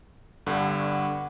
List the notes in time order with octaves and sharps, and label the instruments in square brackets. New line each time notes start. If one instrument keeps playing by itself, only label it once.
[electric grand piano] G2 D3 [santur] B3
[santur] C#6 D6